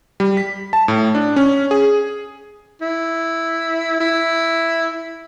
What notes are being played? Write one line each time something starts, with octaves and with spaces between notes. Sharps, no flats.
G3
B6
A5
A2
D4
C#4
G#4
E4
E4